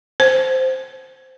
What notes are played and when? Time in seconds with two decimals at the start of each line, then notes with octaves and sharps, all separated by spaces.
0.20 C5